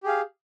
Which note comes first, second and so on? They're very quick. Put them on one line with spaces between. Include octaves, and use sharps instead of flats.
G4 G#4 F5